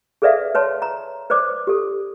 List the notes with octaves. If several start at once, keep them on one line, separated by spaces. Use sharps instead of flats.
G#4 A4 B4 D5 E5 F5
B4 C#5 A5 C6
A#5
B4 C5 D5 D6
G4 A4